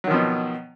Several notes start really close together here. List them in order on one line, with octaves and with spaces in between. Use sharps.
F#3 D#3 F3 B2